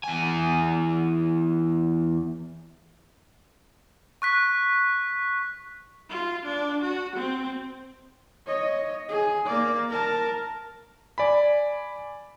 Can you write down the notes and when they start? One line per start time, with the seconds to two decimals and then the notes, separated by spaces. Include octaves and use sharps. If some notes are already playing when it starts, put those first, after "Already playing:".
0.04 E2 G#5
4.22 C#6 F#6 B6
6.10 F4
6.46 D4
6.82 F#4
7.16 C4
8.47 C#5 D#5
9.09 G#4
9.45 A#3 D5
9.90 A#4 A5
11.18 D5 G#5 B5